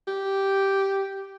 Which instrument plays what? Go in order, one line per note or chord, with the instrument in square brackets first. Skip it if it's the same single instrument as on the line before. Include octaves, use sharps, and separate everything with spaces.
[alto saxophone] G4